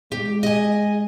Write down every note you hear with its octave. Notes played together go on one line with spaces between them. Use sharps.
G#3 G4
D#5 G#5